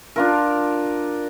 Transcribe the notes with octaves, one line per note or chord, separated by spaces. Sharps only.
D4 F4 A#4